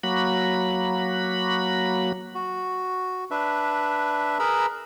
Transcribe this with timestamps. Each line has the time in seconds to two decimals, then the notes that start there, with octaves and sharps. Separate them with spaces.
0.03 F#3 A#3 F#4 B5
2.35 F#4
3.31 D4 B4 E5
4.39 G#4 A#4 B4 A#5 B5 E6